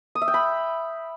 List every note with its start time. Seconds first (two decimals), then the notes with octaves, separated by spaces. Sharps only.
0.15 D#6
0.22 E5
0.28 G5
0.34 B5